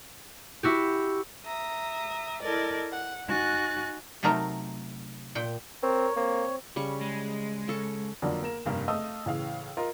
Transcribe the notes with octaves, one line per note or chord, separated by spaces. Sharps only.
E4 F#4 G4
E5 A#5 D#6
E4 A4 A#4 D5 D#5
F#5
D#4 F#4 G#5 F#6 A6
C3 F#3 A3 D#4 A#4 C5
A#2 G5
C4 A#4 C#5
A#3 C4
C#3 G3 C#6
G#3
C#3 A4 C#6
F2 D3 F#3 A#3 D4
A#3 A#4 E7
F1 G2 A#3 F5
A3 D#5 F5 D#6 E6
A2 C#3 E3 F5
F4 A#4 D#5